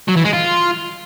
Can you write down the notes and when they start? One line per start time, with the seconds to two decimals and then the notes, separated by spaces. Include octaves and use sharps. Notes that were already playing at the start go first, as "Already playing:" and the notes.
0.08 F#3
0.16 E3
0.25 G#3
0.33 F4